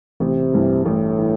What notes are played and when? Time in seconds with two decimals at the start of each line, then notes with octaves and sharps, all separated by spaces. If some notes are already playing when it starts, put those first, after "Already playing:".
0.20 A1 C3
0.53 G2 E3
0.86 A1 A2
1.19 E3